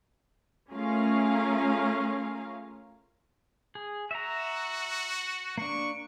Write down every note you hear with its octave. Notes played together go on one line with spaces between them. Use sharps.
A3 C#4 F4 G#4 A#4 F5
G#4
F#4 E5 A#5
A#3 D4 C#6